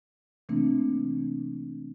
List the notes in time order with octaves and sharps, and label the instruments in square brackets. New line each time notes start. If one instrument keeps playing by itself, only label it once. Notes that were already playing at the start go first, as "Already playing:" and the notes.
[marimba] C3 E3 A3 A#3 C4 D4